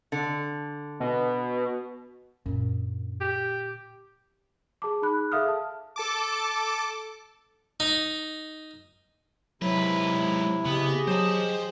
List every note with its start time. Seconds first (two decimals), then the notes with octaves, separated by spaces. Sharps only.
0.12 D3
1.00 B2
2.46 F#2 A#2 D3
3.20 G4
4.82 G#4 A5 D6
5.02 D#4 G#4 B5 F#6
5.32 G#4 A4 E5 F5 D#6 F6
5.48 A5
5.96 A4 A5 D6
7.80 D#4
9.62 G#2 C3 F#3 E4 B4
10.66 C#3 B3 G4 G#4 D#5
11.07 F#3 C5 A5